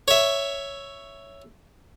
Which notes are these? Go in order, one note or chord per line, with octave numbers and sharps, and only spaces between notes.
C#5 E5